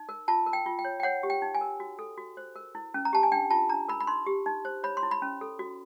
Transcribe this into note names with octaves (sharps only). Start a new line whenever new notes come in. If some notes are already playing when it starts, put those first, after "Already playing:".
Already playing: D#4
A#4
F4 A5
A#4
G5
F4
G5
C#5
G5
C#5 F#5
G4
G5
D#4
G#5
A#4
F#4
A4
F#4
C5
A#4
E4
C#4
A#5
G4 A5
G#5
D4 G5
F4 A5
D4 A#5
A#4 B5
B5
D#4 C6
G4
D#4
C5
C#5 B5
C6
E4
B5
C#4
A4
F#4